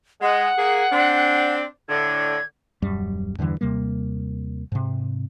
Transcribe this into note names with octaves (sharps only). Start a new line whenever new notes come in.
G#3 F#5
A#3 G#4
C4 D4
A2 D3 G#6
D#1 F#2 G3
E2 G2 D3 E3
D#2 C3 G3 A#3
G#2 C3